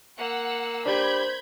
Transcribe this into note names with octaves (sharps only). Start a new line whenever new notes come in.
A#3 F#5 E6
D4 G4 C5 B5 G6 G#6